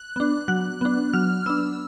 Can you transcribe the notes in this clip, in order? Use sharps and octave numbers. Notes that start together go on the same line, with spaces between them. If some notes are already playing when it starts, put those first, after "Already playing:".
Already playing: F#6
B3 D4
F#3 F#6
B3 D4
F#3 F6
B3 D4 E6